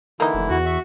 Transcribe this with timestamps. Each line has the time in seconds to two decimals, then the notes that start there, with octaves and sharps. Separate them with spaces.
0.20 D3 E3 A#3 D#4 E4
0.34 F1
0.50 E2 F#4
0.65 E5 C#6